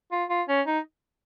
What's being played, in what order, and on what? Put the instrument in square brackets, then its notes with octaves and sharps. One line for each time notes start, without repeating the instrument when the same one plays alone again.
[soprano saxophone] F4
F4
C#4
D#4